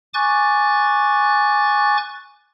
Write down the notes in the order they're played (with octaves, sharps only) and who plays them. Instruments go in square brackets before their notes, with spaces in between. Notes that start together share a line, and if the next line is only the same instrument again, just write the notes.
[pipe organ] G#5 C#6 D6 F#6 A6